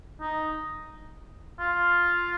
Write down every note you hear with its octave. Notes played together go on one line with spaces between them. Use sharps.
D#4
F4